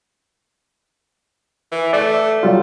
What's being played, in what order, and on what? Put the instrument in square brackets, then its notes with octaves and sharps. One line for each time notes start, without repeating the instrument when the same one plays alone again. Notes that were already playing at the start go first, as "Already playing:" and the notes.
[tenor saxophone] E3
[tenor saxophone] A3 [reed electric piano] D5
[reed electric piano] F#3 G3 F4